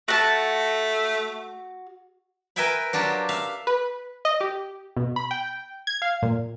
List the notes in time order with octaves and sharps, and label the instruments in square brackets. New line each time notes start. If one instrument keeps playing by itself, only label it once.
[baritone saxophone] A3 [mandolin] F#4 A5
[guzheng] A#4 B4 E5 G5 G#5 B5
F#3 D4 F4 G4
E5 F5
[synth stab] B4
D#5
G4
B2
B5
G5
G#6
F5
A#2